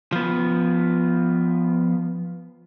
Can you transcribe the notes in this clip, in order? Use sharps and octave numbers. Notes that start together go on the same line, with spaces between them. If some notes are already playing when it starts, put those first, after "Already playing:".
F3 B3